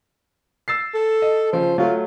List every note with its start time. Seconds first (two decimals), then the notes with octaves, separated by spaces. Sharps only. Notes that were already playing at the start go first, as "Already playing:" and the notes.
0.68 E6 A6 C7
0.94 A4
1.22 D#5
1.53 C#3 F3 C5
1.78 F#3 A3 F4